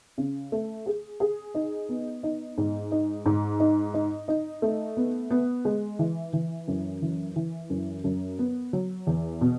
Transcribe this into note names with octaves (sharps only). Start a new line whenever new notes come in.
C#3
A3
G#4
G#4
D#4
B3
D#4
G#2
D#4
G#2
D#4
D#4
D#4
A3
B3
B3
G#3
E3
E3
F#2
E3
E3
F#2
F#2
B3
F#3
E2
B2